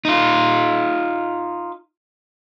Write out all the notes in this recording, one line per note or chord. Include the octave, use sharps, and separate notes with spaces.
D#4 F4